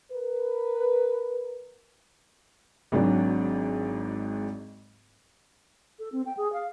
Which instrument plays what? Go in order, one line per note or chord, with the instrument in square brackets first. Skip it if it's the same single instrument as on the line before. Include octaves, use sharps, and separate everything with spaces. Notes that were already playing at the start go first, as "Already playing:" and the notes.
[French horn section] A#4 B4
[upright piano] G#1 G#2 F#3 D4
[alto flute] A4
C4
G5
G#4
F5